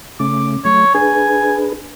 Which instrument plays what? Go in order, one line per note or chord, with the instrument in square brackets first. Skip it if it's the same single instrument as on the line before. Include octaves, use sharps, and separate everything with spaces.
[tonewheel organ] C#3 A3 C#4 [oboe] D6
[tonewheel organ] F#3 A3 [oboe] C#5
[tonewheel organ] D4 G#4 B4 [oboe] G#5